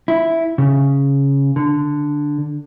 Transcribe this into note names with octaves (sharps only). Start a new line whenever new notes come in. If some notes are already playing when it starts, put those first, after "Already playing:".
E4
C#3
D3